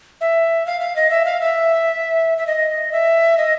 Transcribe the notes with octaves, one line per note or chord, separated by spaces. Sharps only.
E5
F5
F5
D#5
E5
F5
E5
E5
D#5
E5
D#5